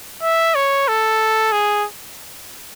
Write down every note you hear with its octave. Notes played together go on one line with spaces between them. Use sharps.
E5
C#5
A4
G#4